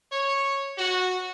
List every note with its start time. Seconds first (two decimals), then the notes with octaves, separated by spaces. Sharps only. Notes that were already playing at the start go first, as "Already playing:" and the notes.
0.12 C#5
0.78 F#4